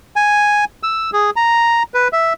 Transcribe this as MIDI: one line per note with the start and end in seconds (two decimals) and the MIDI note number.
0.16 0.65 80
0.83 1.10 88
1.13 1.30 68
1.36 1.83 82
1.94 2.08 71
2.13 2.33 76